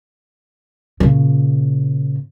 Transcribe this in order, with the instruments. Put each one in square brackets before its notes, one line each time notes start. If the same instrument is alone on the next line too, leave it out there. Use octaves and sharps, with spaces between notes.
[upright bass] A#2 C#3